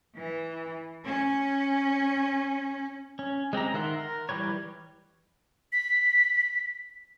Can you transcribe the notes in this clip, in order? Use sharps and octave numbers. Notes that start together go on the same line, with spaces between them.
E3
C#4
C#4
G#3 C4 G4 A#5
D#3 A#4 E5 F#5 C6
A#4
E3 G3 G4 B4 C#5
B6